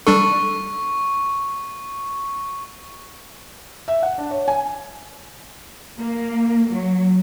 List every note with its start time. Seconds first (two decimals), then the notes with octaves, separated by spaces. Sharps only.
0.07 G3 D4 A4 C#6
3.88 E5
4.03 F#5
4.18 D4
4.31 C#5
4.48 G#5
5.98 A#3
6.69 F#3